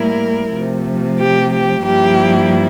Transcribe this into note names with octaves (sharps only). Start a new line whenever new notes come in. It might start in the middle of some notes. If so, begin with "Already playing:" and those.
Already playing: A2 G3 A#3 E4 A#4
C3 F3 A3
G4
G4
G2 F3 A#3 E4 G4